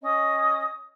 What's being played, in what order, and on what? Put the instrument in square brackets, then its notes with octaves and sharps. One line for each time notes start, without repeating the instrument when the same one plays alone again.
[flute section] C#4 D#5 D#6